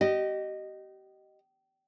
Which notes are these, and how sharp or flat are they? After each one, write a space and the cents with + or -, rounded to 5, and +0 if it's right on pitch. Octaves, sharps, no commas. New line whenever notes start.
G4 -30 D#5 -10